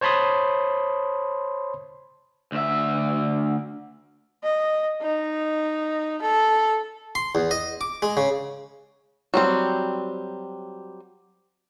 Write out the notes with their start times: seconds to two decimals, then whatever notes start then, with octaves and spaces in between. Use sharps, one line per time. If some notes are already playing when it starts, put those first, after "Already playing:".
0.01 C5 C#5 A5 B5 C6 D#6
2.52 D2 E5
4.43 D#5
5.01 D#4
6.22 A4
7.15 C6
7.35 E2
7.51 D#5
7.81 D6
8.02 G#3
8.17 C#3
9.34 F#3 G3 C4